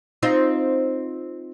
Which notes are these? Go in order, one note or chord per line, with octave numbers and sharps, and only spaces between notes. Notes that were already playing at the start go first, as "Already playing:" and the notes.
C4 D#4 F4